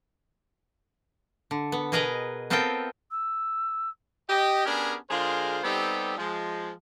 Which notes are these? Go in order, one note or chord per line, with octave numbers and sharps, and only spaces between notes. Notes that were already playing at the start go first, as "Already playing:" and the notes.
D3
B3
B2 G#4 A#4 B4 D#5 A#5
B3 C4 F4 A4 A#4 G5
E6
G4 D#5
B3 C#4 D4 G4 G#4 A#4
D3 G#3 F4 G#4 A#4 C5
G3 B3 C4 D#4 G4 A4
F3 G#3